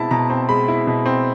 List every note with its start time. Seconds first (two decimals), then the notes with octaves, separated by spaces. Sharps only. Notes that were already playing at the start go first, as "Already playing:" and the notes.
Already playing: B2 G#3 C4 E4 A5 B5
0.11 B2 A#5
0.30 C4
0.49 G#3 B5
0.68 E4
0.87 B2
1.06 C4